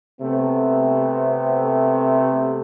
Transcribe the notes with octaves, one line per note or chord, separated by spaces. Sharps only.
C3 A3 B3 C4